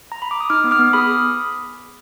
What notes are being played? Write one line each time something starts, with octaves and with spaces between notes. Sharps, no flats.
A#5
B5
D6
D#6
D#4 D6 F6
B3
D6 F6
B3
G#4 B5 D#6